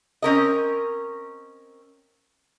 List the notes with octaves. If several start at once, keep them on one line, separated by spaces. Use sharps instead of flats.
C4 C#4 A#4 D#5